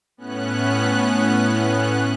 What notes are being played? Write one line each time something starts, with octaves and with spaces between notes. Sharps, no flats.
A2 B3 C#4 F#6